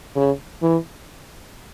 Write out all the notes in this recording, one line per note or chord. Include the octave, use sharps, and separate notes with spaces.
C#3
E3